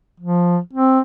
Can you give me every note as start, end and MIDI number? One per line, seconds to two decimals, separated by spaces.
0.20 0.58 53
0.73 1.00 60